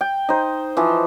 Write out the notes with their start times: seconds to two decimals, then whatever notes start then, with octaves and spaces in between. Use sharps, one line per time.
0.01 G5
0.29 D#4 C5
0.77 E3 F3